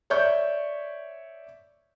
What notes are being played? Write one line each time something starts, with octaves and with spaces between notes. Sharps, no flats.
C#5 D5 E5 C#6 G6